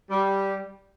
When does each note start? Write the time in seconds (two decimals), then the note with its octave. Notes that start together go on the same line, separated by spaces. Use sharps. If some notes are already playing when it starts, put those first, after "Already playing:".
0.10 G3